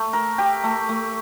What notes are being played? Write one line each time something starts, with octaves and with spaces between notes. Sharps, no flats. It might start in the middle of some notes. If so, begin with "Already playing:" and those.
Already playing: A3
A#4
G4
A3
A3